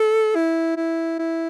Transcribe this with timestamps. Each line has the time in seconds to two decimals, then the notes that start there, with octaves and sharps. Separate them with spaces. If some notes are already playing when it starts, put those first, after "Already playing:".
Already playing: A4
0.35 E4
0.77 E4
1.19 E4